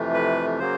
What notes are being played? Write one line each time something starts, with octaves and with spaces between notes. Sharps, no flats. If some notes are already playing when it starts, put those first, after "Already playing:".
Already playing: F2 C3 E3 A3
B4
C#3 F#3 A#3 C5